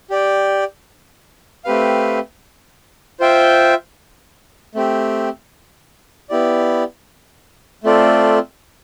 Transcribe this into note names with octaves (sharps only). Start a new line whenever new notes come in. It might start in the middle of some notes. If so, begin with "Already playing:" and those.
G4 D5 G5
A3 C4 G4 B4 F5
F4 C5 E5 G5
A3 C4 G4
B3 E4 G4 D5
A3 C4 F4 A4 D5